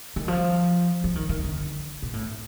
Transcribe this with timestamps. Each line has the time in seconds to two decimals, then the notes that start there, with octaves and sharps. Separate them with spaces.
0.16 D#3
0.28 F3
1.04 F3
1.15 D#3
1.29 D#3
1.44 D3
2.02 A#2
2.13 A2